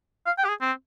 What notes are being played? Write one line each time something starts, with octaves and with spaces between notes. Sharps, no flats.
F5
G5
G4
G#4
C4